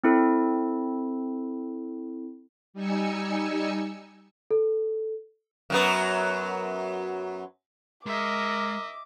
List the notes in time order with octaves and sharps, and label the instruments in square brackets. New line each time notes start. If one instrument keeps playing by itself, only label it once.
[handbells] C4 E4 A4
[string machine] G3 D#4 G#5 E6 C#7
[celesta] A4
[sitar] F#2 F#3 B3
[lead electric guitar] G#3 [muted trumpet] A#4 [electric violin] D#5 E5 [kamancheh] D6